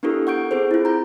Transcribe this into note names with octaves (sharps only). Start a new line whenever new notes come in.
B3 D4 E4 G4 A4 A#4
F#5 C#6 G6 D7
C4 G#4 A#4 C5
E4 F4
A#5 G6